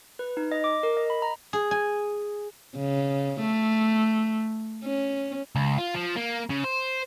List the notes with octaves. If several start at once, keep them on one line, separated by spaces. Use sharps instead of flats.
B4
D#4
D#5
D6
A#4
D#5
B5
A#5
G#4
G#5
C#3
A3
C#4
C#2
F4
F3
A#3
C#3
C5